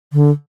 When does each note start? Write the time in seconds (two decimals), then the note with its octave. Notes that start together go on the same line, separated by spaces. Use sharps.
0.13 D3